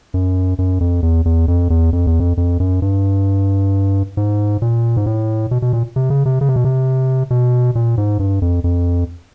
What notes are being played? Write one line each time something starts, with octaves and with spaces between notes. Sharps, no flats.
F#2
F#2
F2
E2
E2
F2
E2
F2
E2
F2
F2
F#2
G2
G#2
A#2
G#2
A2
B2
B2
A#2
C3
C#3
C3
C#3
C3
B2
C3
B2
A#2
G#2
G2
F2
F2